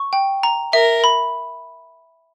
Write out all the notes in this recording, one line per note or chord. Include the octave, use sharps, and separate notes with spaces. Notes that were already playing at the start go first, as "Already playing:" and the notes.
Already playing: C#6
G5
A#5
A#4 E5
B5